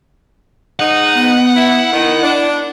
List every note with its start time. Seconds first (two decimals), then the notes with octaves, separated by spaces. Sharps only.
0.80 G#2 D#4 F#5
1.15 B3
1.56 E4
1.92 D#3 E4
2.23 D4